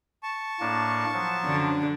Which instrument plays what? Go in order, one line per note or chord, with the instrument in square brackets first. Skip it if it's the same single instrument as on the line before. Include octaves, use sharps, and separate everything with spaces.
[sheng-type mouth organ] A5 C#6
[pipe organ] A2 A#3 D4
F3 F#3
[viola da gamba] F#2 D3 D4